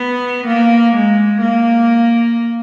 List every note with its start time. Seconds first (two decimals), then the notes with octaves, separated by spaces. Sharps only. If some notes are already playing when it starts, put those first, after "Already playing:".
Already playing: B3
0.47 A#3
0.94 G#3
1.41 A#3